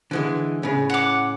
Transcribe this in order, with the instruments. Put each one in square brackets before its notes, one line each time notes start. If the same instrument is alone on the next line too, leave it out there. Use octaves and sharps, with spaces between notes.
[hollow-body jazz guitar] D3 E3 G#3
A2 C#3
[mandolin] F#5 D6